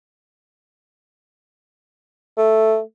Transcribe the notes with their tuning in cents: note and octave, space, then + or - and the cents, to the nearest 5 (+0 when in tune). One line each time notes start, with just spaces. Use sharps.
A3 +0